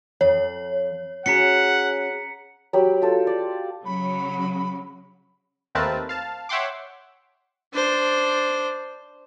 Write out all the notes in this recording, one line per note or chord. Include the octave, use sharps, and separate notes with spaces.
F2 C#5
C#4 F#4 G#4 F#5 A#5 B6 C#7
F#3 G4 G5 B5
F4 A4 E6
D5
C#3 F#3 B5
D#2 A3 C4 A#4 B4 A5
F5 A5
C#5 E5 F#5 G5 C6 D6
D4 C5